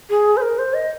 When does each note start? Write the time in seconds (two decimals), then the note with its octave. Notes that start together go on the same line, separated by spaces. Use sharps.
0.10 G#4
0.37 C5
0.42 A#4
0.58 C5
0.74 D#5